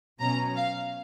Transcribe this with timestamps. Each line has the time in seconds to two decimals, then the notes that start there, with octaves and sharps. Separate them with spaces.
0.20 B2 F#3 C#4 A#5
0.56 F5